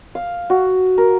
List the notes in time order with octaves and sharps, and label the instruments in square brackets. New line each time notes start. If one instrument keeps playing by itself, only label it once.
[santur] F5
F#4
A#4